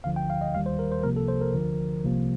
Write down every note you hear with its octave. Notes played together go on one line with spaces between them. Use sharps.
D2 D3 F3 F5
G5
F5
D#5
D#2 D#3 G3 F5
C5
A#4
C5
C2 C3 F3 A#3 A#4
A4
C5
A#4
D2 D3 F3
C2 C3 F3 A#3